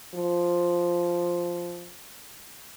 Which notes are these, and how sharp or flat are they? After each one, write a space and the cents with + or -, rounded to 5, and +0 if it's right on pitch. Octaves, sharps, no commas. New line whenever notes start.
F3 +0